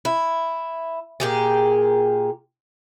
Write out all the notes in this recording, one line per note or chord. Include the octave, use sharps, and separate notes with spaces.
E4
A#2 G4 G#4